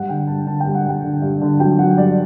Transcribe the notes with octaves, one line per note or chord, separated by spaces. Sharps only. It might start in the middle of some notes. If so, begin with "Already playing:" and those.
Already playing: G2 F#5
D3 G5
G2 A5
D3 A5
G2 G5
F#5
G2 G5
D3
G2
D3
F#3 G5
F#3 F#5
G2 D5